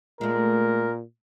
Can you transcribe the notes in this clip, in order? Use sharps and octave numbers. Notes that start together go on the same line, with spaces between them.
A#2 G#3 A3 A#4